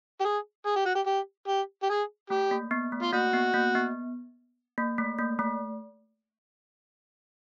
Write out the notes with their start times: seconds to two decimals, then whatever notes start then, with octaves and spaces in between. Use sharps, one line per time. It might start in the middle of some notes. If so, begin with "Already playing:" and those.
0.20 G4
0.24 G#4
0.66 G#4
0.76 G4
0.85 F#4
0.95 G4
1.06 G4
1.48 G4
1.83 G4
1.89 G#4
2.30 A3 G4
2.51 A#3
2.71 B3
2.92 A3
3.03 F4
3.13 A#3 F#4
3.33 B3
3.54 A#3
3.75 B3
4.78 A#3
4.98 A3
5.19 A#3
5.39 A3